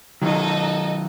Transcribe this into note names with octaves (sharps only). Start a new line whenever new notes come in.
D#3 F#3 D#4 A4 D#5